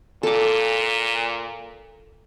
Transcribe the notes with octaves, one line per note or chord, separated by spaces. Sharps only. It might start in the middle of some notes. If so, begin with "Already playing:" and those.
A#2 A4 D6